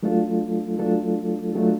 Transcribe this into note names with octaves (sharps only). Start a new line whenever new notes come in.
F#3 A3 D4 F4 A4
F#3 A3 D4 F4 A4
F#3 A3 D4 F4 A4